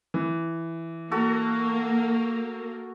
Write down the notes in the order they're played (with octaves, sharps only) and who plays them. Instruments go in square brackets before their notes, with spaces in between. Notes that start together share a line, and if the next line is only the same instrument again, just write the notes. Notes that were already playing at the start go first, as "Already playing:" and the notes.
[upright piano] E3
[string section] A#3 [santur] F#4 A4